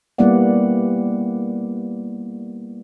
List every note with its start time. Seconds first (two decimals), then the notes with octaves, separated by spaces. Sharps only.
0.18 G3 A#3 B3 E4 D5 F#5